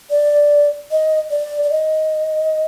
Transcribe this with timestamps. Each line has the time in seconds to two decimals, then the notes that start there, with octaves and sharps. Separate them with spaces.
0.10 D5
0.91 D#5
1.30 D5
1.63 D5
1.70 D#5